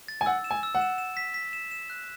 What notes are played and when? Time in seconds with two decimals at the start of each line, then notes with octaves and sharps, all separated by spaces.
0.08 A6
0.21 G#5
0.26 F#5 E6
0.44 E7
0.51 G#5
0.63 E6
0.75 F#5
0.81 E7
0.98 E7
1.17 B6
1.34 B6
1.53 E7
1.71 E7
1.90 F#6